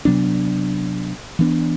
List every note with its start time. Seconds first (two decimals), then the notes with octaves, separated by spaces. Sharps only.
0.05 C3 F#3 B3 D4
1.39 E3 B3 D4